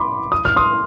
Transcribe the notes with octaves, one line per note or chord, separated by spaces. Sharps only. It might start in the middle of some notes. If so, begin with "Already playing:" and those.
Already playing: B5 C6 D6
D#6
F6
C6 D#6